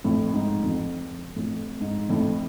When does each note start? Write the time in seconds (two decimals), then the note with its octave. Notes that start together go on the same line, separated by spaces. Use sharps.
0.04 F2 A2
0.34 G#2
0.63 F2
1.36 F2 A2
1.81 G#2
2.09 F2 A2